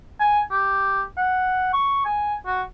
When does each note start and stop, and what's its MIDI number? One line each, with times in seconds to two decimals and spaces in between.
0.20 0.40 80
0.51 1.02 67
1.17 1.69 78
1.73 2.05 85
2.05 2.34 80
2.46 2.62 66